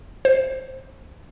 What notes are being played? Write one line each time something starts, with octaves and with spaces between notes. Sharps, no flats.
C5